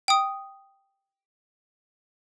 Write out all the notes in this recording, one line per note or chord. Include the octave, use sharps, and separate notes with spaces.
G5 D#6